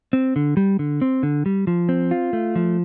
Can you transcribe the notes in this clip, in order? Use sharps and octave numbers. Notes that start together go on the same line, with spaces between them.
C4
D3
G3
D3
C4
D3
G3
F3
C4
F4
A3
F3